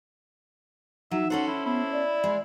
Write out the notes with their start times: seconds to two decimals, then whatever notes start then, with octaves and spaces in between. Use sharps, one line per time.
1.11 F#3 D#4 E5
1.30 C#4 A4 C5 F#5
1.47 E4
1.65 B3 E4
1.92 D5
2.24 G#3